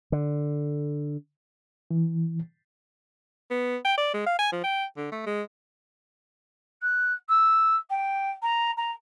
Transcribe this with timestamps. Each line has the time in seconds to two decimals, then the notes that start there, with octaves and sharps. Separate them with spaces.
0.12 D3
1.91 E3
3.51 B3
3.85 G5
3.98 D5
4.14 G#3
4.26 F5
4.39 G#5
4.52 F3
4.64 G5
4.97 D3
5.12 A3
5.26 G#3
6.82 F#6
7.29 E6
7.90 G5
8.42 A#5
8.77 A#5